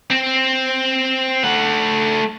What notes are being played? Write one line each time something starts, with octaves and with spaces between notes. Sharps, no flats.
C4
A3 F#5